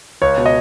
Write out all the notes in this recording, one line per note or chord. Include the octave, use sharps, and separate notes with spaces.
C#2 C#5
B2
D#5